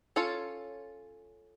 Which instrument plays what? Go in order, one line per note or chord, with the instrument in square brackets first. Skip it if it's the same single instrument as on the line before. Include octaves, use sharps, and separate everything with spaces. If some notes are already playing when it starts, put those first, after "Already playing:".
[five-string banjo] C#4 F4 A4 C#5